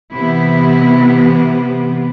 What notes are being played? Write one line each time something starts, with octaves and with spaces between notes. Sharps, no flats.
C3 E3 B3 E4